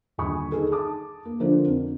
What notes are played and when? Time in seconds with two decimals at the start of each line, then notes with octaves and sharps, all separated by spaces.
0.18 D#1 D3 G#5 B5 C#6 D#6
0.52 D#4 G#4 A4
0.72 A5 D6 D#6
1.25 A#3
1.40 D3 F3 D4 A#4 C5
1.66 F2